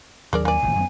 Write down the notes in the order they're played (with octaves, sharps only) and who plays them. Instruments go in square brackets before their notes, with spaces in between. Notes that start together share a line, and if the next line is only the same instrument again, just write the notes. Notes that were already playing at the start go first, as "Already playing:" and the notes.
[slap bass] D#2 F#3 D4 [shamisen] G#4 A#4 D5
[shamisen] A#3 D5 [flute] G#5
[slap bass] D#1 A1 A2
F#2 D#3 B3